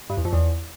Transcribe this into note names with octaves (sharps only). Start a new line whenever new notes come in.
G2
E2
F2
E2